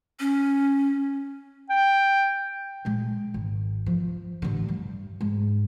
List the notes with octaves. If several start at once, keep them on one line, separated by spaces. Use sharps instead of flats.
C#4
G5
A#2 G#3
G#1
F3
A1 D3
G2
G#2